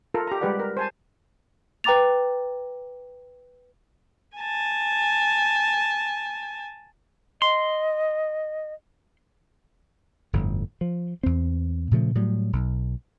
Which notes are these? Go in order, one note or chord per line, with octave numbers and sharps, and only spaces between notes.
F4 A4 A#4
G4 A#5
G3 G#3 G4 B4 D5 F#5
A#4
C5 G#5 A5
B4 G5 A#5 D6 A6 F7
G#5 A5
D#5 C6
G1 F2 A2
F3
E2 C4
A#2 C#3 F3 A3
A2 F#3 G3
B1